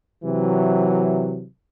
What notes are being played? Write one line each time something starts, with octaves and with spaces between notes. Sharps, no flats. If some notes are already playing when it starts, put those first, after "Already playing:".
C3 E3 F#3